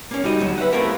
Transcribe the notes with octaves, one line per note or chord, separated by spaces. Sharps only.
A#3 C#4
G3 D#4 F#4 D#5
D2 F#3
B4 E5 F#5
A3 C4 E4 F4 G4 A#4